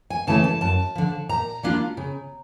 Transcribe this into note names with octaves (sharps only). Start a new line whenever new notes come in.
G#5
C#3 E3 A3 C#4 A5
A5
F#2 A5
D3 F3
A#2 A#5
G3 A#3 D4 F4
C#3